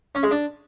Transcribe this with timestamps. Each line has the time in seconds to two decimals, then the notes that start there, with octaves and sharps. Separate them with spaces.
0.15 C#4
0.23 G#3
0.31 D4